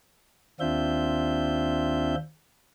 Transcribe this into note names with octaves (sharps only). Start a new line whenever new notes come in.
D#2 C4 D4 F4 E5 G6